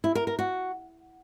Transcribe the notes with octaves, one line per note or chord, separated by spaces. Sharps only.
E4
A#4
A#4
F#4